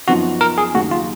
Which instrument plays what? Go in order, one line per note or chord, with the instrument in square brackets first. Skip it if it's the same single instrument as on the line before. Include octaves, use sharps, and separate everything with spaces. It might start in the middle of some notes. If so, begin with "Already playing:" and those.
[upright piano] F#2 F3 B3 D#4 [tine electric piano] F#4
[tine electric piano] A#4
G#4
[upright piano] D#2 C#3 F#3 [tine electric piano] F#4
[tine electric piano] F4